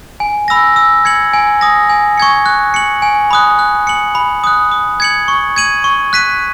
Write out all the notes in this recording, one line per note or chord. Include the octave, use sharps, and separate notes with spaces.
G#5
B5 E6 A#6
E6
G#6 C#7 F#7
G#5
D#6 A#6
G#5
C#6 G#6 C#7
F#6
C#7 F#7
G#5
B5 D#6 F#6
F#6
C#7 F#7
B5
D#6 F#6
D#6
G#6 C#7 F#7
C#6
G#6 D#7 F#7
C#6
F#6 B6 D#7